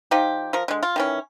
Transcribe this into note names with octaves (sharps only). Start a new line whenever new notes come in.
F3 D#4 F4 G4
F3 A#4
D3 G#3
F4
D#3 E3 C#4